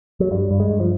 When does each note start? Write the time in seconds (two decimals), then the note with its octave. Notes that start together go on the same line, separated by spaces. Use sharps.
0.20 F#3
0.31 G2 G3
0.51 G2
0.60 G#3
0.70 G2
0.80 F3